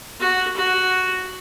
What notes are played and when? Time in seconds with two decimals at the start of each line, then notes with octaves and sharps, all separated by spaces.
0.20 F#4
0.57 F#4